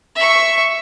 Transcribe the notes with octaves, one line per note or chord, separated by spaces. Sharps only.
E5 C#6